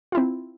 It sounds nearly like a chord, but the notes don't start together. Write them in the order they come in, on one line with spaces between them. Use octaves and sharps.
F4 E4 C4